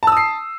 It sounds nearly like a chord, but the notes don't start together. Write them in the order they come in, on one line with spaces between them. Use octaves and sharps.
A5 E6 D#6 C7